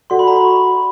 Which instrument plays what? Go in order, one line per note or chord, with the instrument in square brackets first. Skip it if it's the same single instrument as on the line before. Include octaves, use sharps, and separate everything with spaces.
[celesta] F#4 A4 D5 F#5 [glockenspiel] C6
[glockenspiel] B5
A#5
B5
C#6